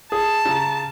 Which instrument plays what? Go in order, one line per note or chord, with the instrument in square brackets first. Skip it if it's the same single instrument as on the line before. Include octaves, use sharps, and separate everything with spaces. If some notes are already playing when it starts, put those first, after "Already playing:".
[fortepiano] G#4 [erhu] A5
[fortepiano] C#3 A#5